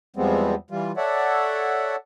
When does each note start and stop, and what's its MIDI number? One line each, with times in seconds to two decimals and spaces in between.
0.16 0.55 40
0.16 0.55 53
0.16 0.55 55
0.16 0.55 56
0.16 0.55 59
0.16 0.55 60
0.71 0.92 52
0.71 0.92 55
0.71 0.92 65
0.97 1.96 69
0.97 1.96 73
0.97 1.96 74
0.97 1.96 76
0.97 1.96 78